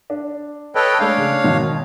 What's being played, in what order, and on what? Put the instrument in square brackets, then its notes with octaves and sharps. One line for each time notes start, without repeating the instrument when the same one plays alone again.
[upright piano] D4
[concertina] A4 B4 [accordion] C#5 D#5 G5
[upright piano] G#3 A3 [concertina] D4 [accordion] C#5 F5
[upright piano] C#3
G#1 B2 D#3